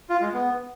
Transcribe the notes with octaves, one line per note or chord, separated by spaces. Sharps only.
F4
G#3
B3